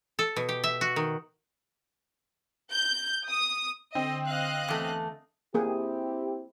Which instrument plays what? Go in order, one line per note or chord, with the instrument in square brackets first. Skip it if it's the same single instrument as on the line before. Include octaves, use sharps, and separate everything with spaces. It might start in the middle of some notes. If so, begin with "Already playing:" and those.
[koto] A4
B2
G4
E5
F#4
D#3
[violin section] G6
D#6
[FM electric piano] D3 [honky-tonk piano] C4 [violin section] D#5
[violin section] D#5 F5 F#6
[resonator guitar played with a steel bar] E2 A3
[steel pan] A#3 G#4 [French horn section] C4 E4 G4